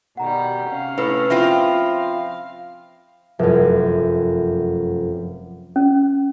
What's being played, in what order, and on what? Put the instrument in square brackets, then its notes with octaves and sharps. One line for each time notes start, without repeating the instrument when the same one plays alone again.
[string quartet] B2 D#3 G3 [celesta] F#5 A#5
[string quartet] C3 C#4 F5
[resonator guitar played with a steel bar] A2 [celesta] B4
[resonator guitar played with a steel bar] F3 C4 F4 [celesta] E5 B5 A#6
[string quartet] F5
[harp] F1 F#2
[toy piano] C#4